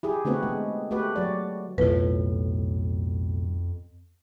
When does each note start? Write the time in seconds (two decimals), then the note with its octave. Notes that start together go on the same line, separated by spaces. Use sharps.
0.03 E4 G4 G#4
0.25 D3 A3 B3 C4 F#4 B4
0.43 G#3
0.91 A3 F#4 G4 B4
1.16 F#3 F#4 D5
1.78 B1 F2 A2 F4 B4